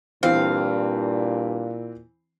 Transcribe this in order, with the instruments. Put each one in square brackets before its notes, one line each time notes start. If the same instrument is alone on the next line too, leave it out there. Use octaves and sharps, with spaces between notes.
[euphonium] G2 [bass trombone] A#2 [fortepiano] E3 C4 [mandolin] F5